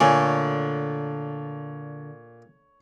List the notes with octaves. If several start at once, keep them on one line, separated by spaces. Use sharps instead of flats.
A#2 D3 A3 C#5 G#5